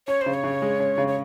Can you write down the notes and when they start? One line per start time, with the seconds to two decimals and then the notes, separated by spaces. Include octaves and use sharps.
0.07 C#4 C#5
0.21 C#3 C5
0.34 C#5
0.44 C#3
0.62 G#3
0.80 C#4
0.98 C#3
1.08 C#5